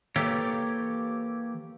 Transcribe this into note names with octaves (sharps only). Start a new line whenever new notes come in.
E3 A#3 G4 A4 C#5